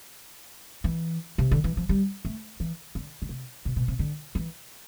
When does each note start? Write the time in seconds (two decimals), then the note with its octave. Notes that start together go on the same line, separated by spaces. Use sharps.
0.84 E3
1.38 C3
1.51 D3
1.64 E3
1.77 F3
1.89 G3
2.25 A3
2.60 E3
2.95 D3
3.22 D3
3.29 C3
3.65 C3
3.76 B2
3.88 C3
3.99 D3
4.35 E3